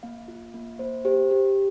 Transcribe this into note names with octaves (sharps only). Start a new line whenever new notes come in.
A#3 F5
F4
A#3
A#3 C5
G4 C5
G4